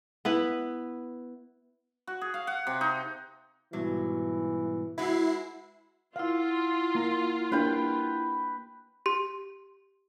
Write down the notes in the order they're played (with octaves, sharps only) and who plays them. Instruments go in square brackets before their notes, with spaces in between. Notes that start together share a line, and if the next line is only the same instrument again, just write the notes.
[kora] B3 E4 B4
[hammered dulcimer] F#4
G#4
F5
F#5
C3
D#4
[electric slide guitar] G#2 B2 G3 [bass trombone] E3 [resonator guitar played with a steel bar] F#3
[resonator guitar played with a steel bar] G#3 F#4 B4 [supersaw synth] E4 C7
[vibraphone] E4 F#5 [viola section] F4 [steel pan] F5
[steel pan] A#3 A#5
[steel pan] A#3 D4 G4 [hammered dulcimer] B4 G5
[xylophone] G4 C6